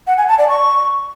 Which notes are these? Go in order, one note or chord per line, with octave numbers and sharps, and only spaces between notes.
F#5
G#5
A5
D5
C#6